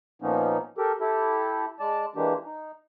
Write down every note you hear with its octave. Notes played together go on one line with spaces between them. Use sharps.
A#2 F3 A#3 B3 C#4 D#4
G4 A4 A#4
E4 G4 A4
G#3 D5 A5
E3 G#3 A#3 D4 G4
D#4